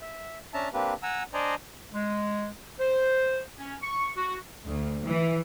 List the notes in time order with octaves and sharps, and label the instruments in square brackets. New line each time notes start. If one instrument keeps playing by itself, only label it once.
[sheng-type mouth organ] E5
C#4 D4 E5 A5 A#5
A#3 C4 D4 G4 B4
F#5 G#5 A#5 E6
D4 C5 D5 D#5 G#5 A#5
[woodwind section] G#3
C5
C#4
C#6
F#4
[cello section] D2
E3